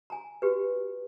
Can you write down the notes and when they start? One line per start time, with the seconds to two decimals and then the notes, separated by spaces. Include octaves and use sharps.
0.10 G#5 A#5
0.42 F#4 G4 B4